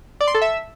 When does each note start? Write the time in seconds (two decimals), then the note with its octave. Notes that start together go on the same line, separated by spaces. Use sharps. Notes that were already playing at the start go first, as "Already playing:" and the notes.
0.21 D5
0.28 C6
0.35 A4
0.42 E5